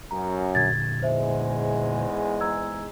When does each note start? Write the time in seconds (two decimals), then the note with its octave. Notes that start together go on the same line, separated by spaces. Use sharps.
0.11 F#2 A#5
0.55 A#2 D3 G#6 A6
1.03 E2 G#2 G#3 C5 E5
2.41 A#5 E6 G#6